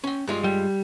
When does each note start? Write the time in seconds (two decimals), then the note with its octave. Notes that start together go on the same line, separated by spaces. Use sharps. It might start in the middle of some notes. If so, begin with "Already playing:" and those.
0.04 C#4 G5
0.27 G2 G#3 F4
0.44 G3